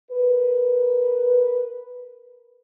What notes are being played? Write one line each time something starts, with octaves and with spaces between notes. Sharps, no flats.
A#4 B4